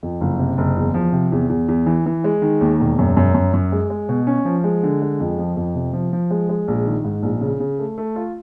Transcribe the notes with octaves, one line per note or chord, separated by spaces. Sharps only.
F2
F#1
C3
F#1
E2
F3
C3
E2
E2
E2
E3
E3
G#3
D#3
D#2
E1
F#2
F#2
F#2
F#2
G#3
G#3
B2
C#4
F3
G#3
D3
G#3
F2
F3
F2
C3
F3
F3
G#3
G#3
A#1
D#3
G#2
A#1
C#3
C#3
A3
A3
F4